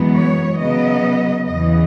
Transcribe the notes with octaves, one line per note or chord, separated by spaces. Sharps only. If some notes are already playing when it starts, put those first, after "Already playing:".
Already playing: F#2 E3 G#3 B3
C#5
C#3 F#3 B3 D#5
E2 C#3 E3 D#5